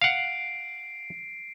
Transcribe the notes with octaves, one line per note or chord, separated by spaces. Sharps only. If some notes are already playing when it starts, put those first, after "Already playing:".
F5 F#5 C7 D7